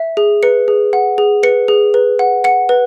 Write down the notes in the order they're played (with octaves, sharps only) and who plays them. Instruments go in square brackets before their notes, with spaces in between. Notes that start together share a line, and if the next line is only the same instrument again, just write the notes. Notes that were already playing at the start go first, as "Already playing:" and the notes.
Already playing: [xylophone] E5
G#4
B4 C#7
G#4
F#5
G#4
B4 C#7
G#4
B4
F#5
F#5 C#7
B4